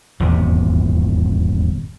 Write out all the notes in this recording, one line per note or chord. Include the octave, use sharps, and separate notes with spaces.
D#1 G#1 E2 C3